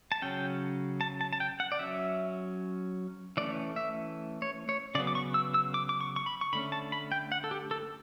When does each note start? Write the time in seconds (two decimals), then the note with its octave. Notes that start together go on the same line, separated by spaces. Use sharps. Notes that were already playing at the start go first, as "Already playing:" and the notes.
0.12 A5
0.22 C#3 F#3 C#4 G5
1.01 A5
1.21 A5
1.33 A5
1.40 G5
1.60 F#5
1.72 D5
1.79 F#3 C#4 E5
3.37 E3 A3 C#4 D5
3.76 E5
4.42 C#5
4.69 C#5
4.95 C#3 D5
4.98 F#3 B3
5.07 D6
5.15 C#6
5.34 E6
5.54 E6
5.74 D6
5.89 D6
6.01 C#6
6.16 C#6
6.26 B5
6.41 C#6
6.53 D3 A3 C#4 B5
6.72 A5
6.92 B5
7.12 G5
7.32 F#5
7.44 A4
7.51 G4
7.71 A4